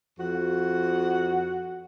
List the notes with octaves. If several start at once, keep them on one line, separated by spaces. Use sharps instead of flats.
F2 F#4 F#5